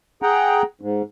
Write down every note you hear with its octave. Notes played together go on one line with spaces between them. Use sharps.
G#4 F#5 G5 A#5
G#2